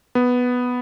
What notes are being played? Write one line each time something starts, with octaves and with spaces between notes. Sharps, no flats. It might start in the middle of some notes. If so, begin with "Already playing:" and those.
B3